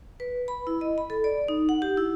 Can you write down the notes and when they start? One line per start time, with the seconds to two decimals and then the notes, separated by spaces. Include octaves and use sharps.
0.20 B4
0.48 B5
0.67 E4
0.81 D#5
0.98 B5
1.10 A4
1.24 D5
1.48 D#4
1.69 F#5
1.82 G4
1.97 E4